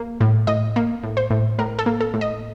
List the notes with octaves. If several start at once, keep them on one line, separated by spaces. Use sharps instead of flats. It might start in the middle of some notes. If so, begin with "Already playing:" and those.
Already playing: A#3
A2
A2 D#5
A#3
A2
C5
A2
A2 A#4
A4
A#3
A4
A2
D#5